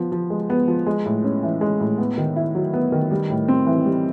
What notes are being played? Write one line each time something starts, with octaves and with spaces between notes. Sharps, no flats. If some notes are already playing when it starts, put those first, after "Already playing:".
Already playing: F3 B3
F3
G#3
B3
F3
G#3
A2
C#4
E3
G#3
A2
B3
D#3
E4
F#3
B3
D#3
G3
A2
C4
E3
G3